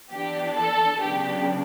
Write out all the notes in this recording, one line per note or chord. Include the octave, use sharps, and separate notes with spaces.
E3 B3 D4 G4
A4
C#3 F#3 B3 D4 G4